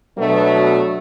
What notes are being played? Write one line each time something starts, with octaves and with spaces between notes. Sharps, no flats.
B2 F#3 A3 B3 D4